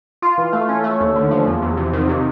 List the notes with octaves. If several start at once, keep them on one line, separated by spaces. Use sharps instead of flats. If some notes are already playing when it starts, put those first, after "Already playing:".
F4
E3
A3
C#4
A3
D#2
D3
F3
E2
E2
C3
D#3
C3